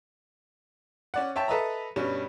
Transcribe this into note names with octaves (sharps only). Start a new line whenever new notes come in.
C#4 D5 F#5
C#5 E5 G5 A5
A4 B4 D#5 E5 A#5
G2 B2 G3 C#4